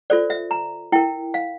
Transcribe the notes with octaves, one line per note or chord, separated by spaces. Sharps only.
F4 A4 C5 D5
E5
A#5
E4 A#4 G5
F5